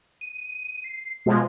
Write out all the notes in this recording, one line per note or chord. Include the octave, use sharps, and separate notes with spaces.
D#7
C7
B2 F3 G#3